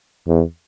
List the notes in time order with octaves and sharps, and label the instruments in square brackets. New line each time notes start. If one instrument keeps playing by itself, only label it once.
[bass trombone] E2